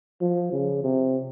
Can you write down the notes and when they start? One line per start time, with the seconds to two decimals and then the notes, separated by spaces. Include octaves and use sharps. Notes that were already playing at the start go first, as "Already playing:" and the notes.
0.22 F3
0.52 C#3
0.84 C3